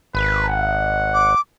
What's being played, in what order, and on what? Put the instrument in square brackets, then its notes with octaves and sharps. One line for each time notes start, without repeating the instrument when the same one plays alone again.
[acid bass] G#1 [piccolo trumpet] B4
[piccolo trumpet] F#5
[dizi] D6